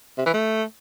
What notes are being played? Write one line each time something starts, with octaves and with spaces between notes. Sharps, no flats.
C3
E3
A3